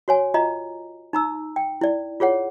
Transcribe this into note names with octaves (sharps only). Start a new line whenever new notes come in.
F#4 C#5 G#5
F4 D#5 A#5
D#4 A#5 E6
G5
E4 D5
F4 G#4 C#5 F#5